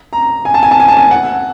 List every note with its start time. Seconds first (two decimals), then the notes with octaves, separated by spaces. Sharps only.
0.13 A#5
0.45 G#5
0.54 A5
0.63 G#5
0.71 A5
0.80 G#5
0.88 A5
0.97 G#5
1.11 F#5